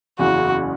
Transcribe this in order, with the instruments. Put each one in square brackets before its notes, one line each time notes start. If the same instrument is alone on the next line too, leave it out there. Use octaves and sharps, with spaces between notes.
[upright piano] F#1 E2 C#3 [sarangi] F#4